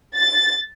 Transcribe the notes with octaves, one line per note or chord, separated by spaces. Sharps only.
A6